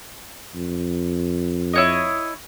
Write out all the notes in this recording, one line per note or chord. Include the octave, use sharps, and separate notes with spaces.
F2
E4 C#5 D#5